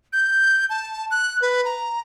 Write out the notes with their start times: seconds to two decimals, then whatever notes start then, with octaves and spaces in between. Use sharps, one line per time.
0.13 G6
0.70 A5
1.11 F#6
1.42 B4
1.65 A#5